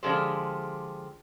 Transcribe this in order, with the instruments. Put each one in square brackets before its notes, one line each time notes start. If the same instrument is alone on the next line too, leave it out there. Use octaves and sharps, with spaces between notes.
[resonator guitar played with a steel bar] D3 F3 G#3 F4 G4 C5